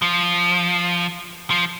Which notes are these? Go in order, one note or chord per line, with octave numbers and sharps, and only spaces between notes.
F3
F3